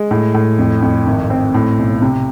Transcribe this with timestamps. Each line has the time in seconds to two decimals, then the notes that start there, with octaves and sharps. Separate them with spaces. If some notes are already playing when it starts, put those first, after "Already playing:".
Already playing: G#3
0.11 A2
0.34 A2
0.58 F2
0.82 F2
1.06 G#1
1.30 C4
1.54 A2
1.78 B1
2.02 C3